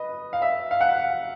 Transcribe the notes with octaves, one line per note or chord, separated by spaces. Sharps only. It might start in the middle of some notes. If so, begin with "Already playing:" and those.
Already playing: B4 D#5
F5
E5
F5
F#5
F5